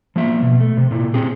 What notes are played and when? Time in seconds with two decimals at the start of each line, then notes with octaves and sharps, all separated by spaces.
0.16 F3 A#3 E5
0.42 B2
0.60 A3
0.77 C3
0.91 A#2 E4
1.14 C4 G4 G#4